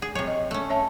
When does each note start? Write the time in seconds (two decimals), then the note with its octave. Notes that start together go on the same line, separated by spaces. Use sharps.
0.02 G#4
0.15 C3 F#3 C#5
0.27 D#5
0.51 A3 C#4
0.70 C#5 E5 A5